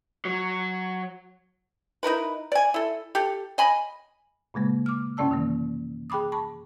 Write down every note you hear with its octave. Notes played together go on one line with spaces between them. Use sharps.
F#3
D#4 E4 A#4 B4
D5 G#5
E4 A4
G4 A4
D#5 G#5 B5
A#2 C#3 G#3 A#3
D6 F6
F#2 C3 C#4 D5 A5 E6
D#3 E3 A#3
G#4 G5 B5 D6 D#6
A5 B5 C#6